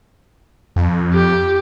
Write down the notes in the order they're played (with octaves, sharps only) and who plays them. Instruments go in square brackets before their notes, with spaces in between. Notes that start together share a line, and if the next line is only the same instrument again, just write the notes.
[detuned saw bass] F2
[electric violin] G4